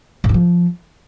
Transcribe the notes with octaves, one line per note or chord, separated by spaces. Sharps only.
G#2
G2
F3